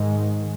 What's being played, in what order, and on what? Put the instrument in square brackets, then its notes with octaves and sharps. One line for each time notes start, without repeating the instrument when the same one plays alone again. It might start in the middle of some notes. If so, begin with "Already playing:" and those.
Already playing: [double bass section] G#2 D#3 G#3